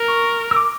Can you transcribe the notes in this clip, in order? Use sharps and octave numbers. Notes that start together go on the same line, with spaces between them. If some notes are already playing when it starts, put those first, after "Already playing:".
Already playing: A#4
C#6
E6
D6